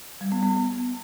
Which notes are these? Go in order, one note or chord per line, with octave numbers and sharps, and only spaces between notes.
G3
B3
B3